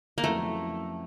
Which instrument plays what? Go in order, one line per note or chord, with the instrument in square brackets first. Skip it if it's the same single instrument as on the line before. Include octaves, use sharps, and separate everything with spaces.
[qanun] A#3
[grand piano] F2 C#3 F#3 B3 E4 [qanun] A3